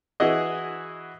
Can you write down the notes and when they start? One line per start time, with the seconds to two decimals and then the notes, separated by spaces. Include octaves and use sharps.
0.20 E3 E4 F#4 G#4 D#5